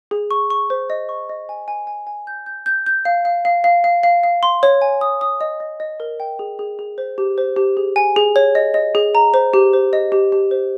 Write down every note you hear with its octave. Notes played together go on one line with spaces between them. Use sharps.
G#4
C#6
C#6
C5
D#5
C#6
D#5
G#5
G#5
G#5
G#5
G6
G6
G6
G6
F5
F5
F5
F5
F5
F5
F5
C6
C#5
G#5
D#6
D#6
D#5
D#5
D#5
A#4
G5
G#4
G#4
G#4
C5
G4
C5
G4
G#4
G#5
G#4
C#5
D#5
D#5
G#4
A#5
C5
G4
C5
D#5
G4
G4
C5